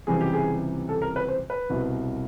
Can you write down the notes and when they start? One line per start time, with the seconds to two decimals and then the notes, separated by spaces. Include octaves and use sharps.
0.07 C#2 C3 E3 G3 G#4
0.21 G4
0.33 G#4
0.89 A4
1.02 A#4
1.16 B4
1.28 C5
1.50 B4
1.70 C2 B2 G3